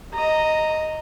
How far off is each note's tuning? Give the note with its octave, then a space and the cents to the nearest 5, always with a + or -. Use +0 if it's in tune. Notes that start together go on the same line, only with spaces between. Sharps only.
D#5 +0 A#5 -5